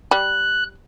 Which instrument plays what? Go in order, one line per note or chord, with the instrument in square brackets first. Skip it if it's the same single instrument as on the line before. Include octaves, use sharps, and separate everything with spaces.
[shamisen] G3 [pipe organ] F#6